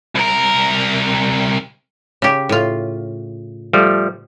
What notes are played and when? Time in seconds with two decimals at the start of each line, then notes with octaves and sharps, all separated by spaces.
0.15 C2 A#4
2.22 C#3 G4
2.49 A2 F4
3.73 F3 G3 A3